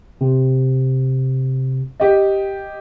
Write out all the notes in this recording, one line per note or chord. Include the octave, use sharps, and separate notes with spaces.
C3
G4 D#5